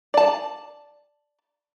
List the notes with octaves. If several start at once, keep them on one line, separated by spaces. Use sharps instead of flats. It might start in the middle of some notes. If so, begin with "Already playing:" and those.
D5 A5